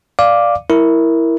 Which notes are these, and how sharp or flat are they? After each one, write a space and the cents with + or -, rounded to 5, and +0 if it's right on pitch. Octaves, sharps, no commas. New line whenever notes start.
D5 +0 F5 +0 D6 +0
E4 +0 A#4 +0